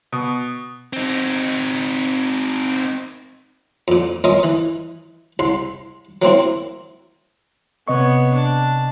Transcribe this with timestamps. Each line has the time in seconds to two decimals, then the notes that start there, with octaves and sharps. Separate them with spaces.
0.12 B2
0.93 C4 D#4
3.88 F2 A#2
4.24 A#3 C#4 F4 D#5 E5
4.43 E3
5.39 C2 C6
6.22 F#3 A#3 C4 E4
7.88 C3 B3 C#5 D#5 C#6
8.34 D4 A5